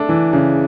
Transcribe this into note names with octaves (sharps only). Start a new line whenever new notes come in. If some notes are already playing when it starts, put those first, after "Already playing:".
Already playing: A3 D4
E3
C#3